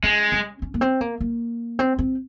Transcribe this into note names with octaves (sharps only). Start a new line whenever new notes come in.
G#3 C#4
C#4
C#4
A#3
C4
A#3
A#3
C4
C4